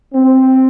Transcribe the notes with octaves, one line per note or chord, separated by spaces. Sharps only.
C4